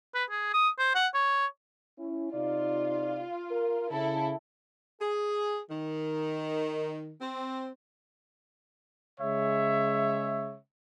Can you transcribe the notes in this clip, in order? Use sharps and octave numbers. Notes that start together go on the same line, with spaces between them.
B4
G#4
D#6
C5
F#5
C#5
C#4 E4
C3 D#4 F4 D5
A#4
C#3 E4 A4
G#4
D#3
C4
C#3 G#3 C#5 E5